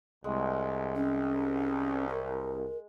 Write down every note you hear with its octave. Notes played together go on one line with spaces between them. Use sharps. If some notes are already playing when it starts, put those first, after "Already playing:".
C2 G#3
C#4
A#4